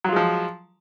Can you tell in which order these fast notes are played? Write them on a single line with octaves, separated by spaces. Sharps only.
F#3 F4 G#3 F3